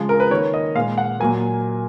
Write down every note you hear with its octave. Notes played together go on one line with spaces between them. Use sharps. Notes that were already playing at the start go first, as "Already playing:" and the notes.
Already playing: C#3 F3 G#3
A#4
B4
D#3 A#3 C#5
D#5
A#2 G#3 F5
F#5
A#2 F#3 A#3 G#5